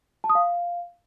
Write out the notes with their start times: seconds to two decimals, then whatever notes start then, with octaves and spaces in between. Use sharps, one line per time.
0.24 A5
0.30 D#6
0.35 F5